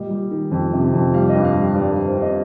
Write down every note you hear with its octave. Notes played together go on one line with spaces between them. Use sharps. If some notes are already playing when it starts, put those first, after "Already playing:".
Already playing: A#2 G3 D#5
G3
D#3
F2
C3
F2
G3 F5
D#5
G2
F5
G3
G2 D5
A#4
G2
C5
G2 D#5